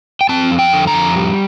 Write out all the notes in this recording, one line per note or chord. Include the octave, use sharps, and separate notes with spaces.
G5
C4 A5
F2
G5
D3
A#5
F2
G3